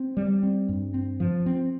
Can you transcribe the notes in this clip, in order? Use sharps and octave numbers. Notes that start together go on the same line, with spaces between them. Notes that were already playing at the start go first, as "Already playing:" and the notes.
Already playing: C4
G3
C4
G2
C4
F3
C4